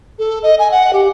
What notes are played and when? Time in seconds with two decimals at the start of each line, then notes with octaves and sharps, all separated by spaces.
0.19 A4
0.43 D#5
0.59 G#5
0.71 F#5
0.93 G4